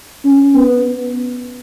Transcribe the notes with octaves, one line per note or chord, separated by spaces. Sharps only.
C#4
B3